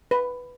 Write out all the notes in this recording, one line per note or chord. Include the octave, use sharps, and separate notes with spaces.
B4